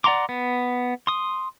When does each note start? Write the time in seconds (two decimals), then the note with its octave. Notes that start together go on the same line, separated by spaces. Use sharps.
0.04 D5 F#5 A#5 C6 D6
0.29 B3
1.07 C6 D#6